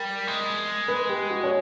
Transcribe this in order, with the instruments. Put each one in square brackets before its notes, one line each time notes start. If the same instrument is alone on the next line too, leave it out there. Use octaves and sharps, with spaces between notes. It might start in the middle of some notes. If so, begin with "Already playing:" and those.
Already playing: [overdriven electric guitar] G3 [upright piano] A#4
[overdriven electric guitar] G#3
[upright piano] B4
G4
F#4
C#5